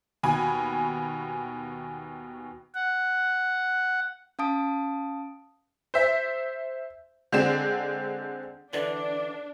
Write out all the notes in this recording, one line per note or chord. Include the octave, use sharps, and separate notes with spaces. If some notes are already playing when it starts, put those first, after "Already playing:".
D#2 B2 G#5 B5
F#5
C#4 F5 A5 D#6 D7
C5 E5
D3 G#3 C4 E7
D3 E3 D4 D5